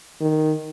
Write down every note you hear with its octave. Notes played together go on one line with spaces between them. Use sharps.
D#3